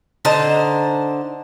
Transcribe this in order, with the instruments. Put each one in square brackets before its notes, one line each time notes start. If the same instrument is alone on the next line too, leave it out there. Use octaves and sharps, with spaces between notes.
[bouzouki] D3 D#4 C5 A5